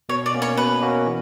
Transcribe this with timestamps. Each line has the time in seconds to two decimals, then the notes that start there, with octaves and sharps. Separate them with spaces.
0.09 B2 C#5
0.26 D5
0.34 A#3 C#4 F#4
0.42 C#5
0.57 B2 B4
0.82 A#3 C#4 F#4
1.06 E3